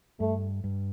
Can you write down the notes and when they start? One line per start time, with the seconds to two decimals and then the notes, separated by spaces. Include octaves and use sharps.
0.20 G2 A3
0.64 G2